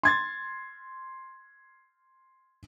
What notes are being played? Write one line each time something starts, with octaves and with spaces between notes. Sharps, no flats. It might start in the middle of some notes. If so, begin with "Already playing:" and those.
C6 G#6 A6